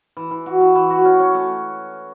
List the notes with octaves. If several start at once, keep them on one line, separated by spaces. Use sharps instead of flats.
E3
E3
F#4
E3
E3
F#4
C#4
C#4
A3